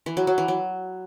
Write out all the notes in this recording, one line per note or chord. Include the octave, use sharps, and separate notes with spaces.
E3
F#3
F#3
E3
F#3